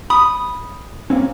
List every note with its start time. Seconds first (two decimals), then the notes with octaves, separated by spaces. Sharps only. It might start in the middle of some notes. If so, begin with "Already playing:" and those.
0.10 B5 D#6
1.10 A#3 C4 C#4